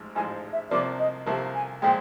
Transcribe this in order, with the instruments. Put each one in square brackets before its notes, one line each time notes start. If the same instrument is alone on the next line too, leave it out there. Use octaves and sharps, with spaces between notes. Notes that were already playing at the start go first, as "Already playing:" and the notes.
Already playing: [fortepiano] A1 G#2 F3 G#3
[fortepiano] A1 G#2 F3 G#3 [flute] G#5
[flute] E5
[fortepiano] C2 C3 F3 A#3 [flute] D5
[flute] D#5
[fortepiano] C2 C3 F3 A#3 [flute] A5
[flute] G#5
[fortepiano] A#2 F3 G#3 [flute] G5